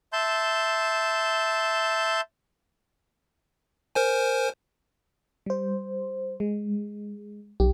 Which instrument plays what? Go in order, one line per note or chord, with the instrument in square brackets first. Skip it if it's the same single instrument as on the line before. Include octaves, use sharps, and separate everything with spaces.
[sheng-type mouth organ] E5 A5 C6 G6
[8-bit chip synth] A#4 C5 G#5
[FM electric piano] G3 C5
G#3
[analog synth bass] B1 [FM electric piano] G4